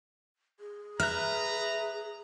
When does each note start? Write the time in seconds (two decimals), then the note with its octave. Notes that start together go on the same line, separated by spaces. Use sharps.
0.60 G#4
1.00 B4 E5 A#5 F6 F#6